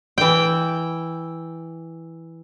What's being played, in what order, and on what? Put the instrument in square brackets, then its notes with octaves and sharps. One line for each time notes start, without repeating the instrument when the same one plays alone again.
[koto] E3 G5